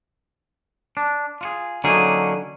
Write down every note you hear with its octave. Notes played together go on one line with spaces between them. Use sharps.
D4
F4 F#4 G#4
D3 F#3 A#3 C#4 D#4 G#4